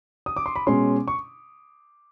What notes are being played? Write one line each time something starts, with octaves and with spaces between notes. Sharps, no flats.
D#6
D6
C6
B5
B2 G#3 C#4 C6
C#6